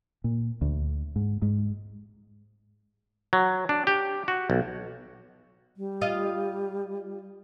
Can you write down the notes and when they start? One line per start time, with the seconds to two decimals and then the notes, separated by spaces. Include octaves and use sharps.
0.24 A#2
0.61 D2
1.16 G#2
1.42 G#2
3.33 F#3
3.69 D4
3.87 G4
4.28 F#4
4.50 B1
5.77 G3
6.01 F4 D#5